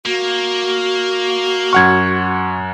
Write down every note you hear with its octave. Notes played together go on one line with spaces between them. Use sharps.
A#3 F#4
F#2 F#5 C#6 F6 G#6